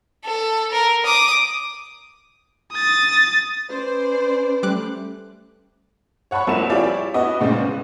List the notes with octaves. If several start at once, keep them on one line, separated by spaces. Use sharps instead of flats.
A4
A#4
D6 D#6
D#6 A6
C#4 B4 C5 D5
G3 A3 D6 F#6
C#5 F#5 A5 B5 C#6
C2 F3 A#3 E4 F#5 E7
E4 F4 G4 G#4 C#5 D5
B3 E4 F#4 D#5
A#2 C#3 G#3 C4 C#4
B3